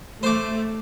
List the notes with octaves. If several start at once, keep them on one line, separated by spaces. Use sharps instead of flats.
A3 C5 D6